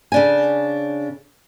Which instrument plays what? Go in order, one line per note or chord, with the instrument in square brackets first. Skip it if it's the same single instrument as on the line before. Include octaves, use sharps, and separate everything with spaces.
[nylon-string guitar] C#3 D4 G#5